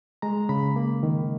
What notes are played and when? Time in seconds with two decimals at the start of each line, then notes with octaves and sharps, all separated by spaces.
0.22 G#3 A#5
0.49 C#3 B5
0.76 A#3
1.03 D#3